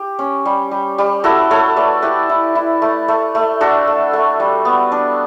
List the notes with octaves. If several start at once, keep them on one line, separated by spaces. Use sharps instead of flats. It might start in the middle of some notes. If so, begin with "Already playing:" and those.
Already playing: G4
C#4
G3
G3
G3
E4 F#4 A4
A3 A4 C#5
A3 B4 D5
E4 G4 B4
E4
E4
A3
A3
A3
D4 F#4 A4
A3
A3
G3
B3
D4